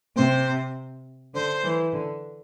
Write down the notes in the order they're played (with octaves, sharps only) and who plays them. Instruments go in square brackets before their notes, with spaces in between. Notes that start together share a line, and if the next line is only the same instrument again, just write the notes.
[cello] C3 [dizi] C5
[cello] D3 [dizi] C5
[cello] E3
D3